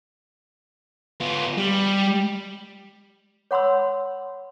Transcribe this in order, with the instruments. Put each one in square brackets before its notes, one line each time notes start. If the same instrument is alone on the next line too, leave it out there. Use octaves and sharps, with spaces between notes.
[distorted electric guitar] B3 F4
G3
[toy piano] C#5 F#5 B5 C6 E6